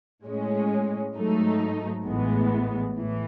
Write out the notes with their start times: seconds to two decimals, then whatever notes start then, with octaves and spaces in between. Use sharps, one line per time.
0.25 A2 G#3 C#4
1.15 G#2 F#3 A3 D#4
2.06 A1 A2 E3 G#3 B3
2.96 A2 E3